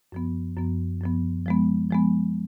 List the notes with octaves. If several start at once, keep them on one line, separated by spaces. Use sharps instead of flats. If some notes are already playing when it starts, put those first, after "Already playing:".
F#2 F3 B3
F#2 F3 B3
F#2 F3 B3
F3 G#3 B3
F3 G#3 B3